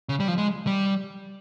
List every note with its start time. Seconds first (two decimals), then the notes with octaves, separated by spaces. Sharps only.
0.09 C#3
0.20 G3
0.28 F3
0.38 G#3
0.67 G3